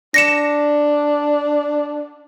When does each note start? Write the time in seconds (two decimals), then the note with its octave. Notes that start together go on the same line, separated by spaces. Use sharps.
0.14 D4 A#6 C#7 E7